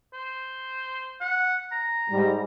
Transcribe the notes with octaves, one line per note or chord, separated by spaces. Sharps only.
C5
F#5
A#5
G#2 G3